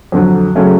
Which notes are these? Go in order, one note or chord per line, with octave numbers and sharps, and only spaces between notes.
F2 D3 F#3
C#3 F#3 A3 C#4